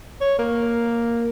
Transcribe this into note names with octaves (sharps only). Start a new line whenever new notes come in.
C#5
A#3